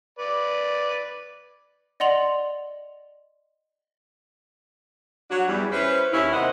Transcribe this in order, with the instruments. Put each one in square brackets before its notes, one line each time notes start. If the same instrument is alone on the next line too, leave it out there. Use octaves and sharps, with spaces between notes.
[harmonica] B4 D5
[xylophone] D5 D#5 F#5 C6 F7 F#7
[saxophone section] F#3 D4 F#4
E2 G3
C#4 E4 B4 C5
D#2 C#4 E4
C3 D#3 C5 D#5 F#5